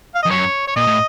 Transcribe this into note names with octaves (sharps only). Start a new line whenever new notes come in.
F5
D#5
F2
F#2 C#5
C#5
A#2 D#5
A2